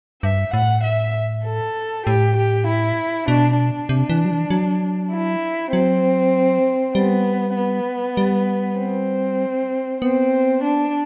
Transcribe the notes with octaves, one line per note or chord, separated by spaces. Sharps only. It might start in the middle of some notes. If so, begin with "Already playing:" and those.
G2 E5
A2 F#5
E5
A4
A2 G4
G4
E4
B2 D4
D4
C3
E3
F#3
E3
F#3
E4
F#3 C4
G3 B3
B3
G3
C4
B3 C4
D4